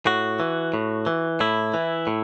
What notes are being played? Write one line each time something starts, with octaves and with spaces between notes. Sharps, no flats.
A2 F#4
E3
A2
E3
A2 E4
E3
A2